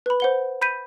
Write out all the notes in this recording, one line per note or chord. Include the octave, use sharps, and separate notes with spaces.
B4 B5
C5 F#5 G7
B5 G6 B6 D#7